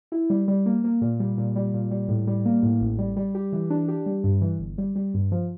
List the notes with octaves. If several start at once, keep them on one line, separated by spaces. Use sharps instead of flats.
E4
G3
G3
A#3
A#3
A#2
G3
A#2
G3
A#2
G3
A2
G3
A#3
A2
A1
G3
G3
G4
E3
D4
G4
G3
G2
E3
G1
G3
G3
G2
F3